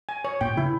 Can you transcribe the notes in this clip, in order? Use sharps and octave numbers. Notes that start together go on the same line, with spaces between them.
G#5
C#5
A#2 G5
C#3 E4